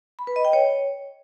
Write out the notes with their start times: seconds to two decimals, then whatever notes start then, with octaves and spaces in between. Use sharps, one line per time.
0.19 B5
0.27 B4
0.36 D#5
0.45 G5
0.53 C#5